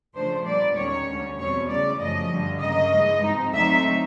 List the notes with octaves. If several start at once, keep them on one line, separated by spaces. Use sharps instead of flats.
C#3 F3 A3 D4 C5
A#2 G3 B3 D5
D#2 D#3 G#3 C#4 C#5
D2 D3 G3
E2 B2 G3 C4 C#5
C#3 E3 A3 D5
F#2 C#3 F3 A3 D#5
G2 D3 G3
C#3 F#3 A#3 D#5
G2 E3 G#3
G#2 F3 G#3 C4 D#4
D3 F#3 A3 C4 D#4 E5